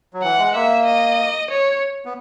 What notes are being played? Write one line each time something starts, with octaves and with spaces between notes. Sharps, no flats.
F#3
E3 F#5
G#3
A#3 E5
D#5
C#5
B3